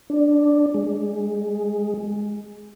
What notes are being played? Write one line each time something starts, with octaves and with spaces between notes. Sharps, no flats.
D4
G#3